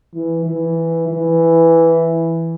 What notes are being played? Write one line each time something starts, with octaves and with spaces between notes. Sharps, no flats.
E3
E3
E3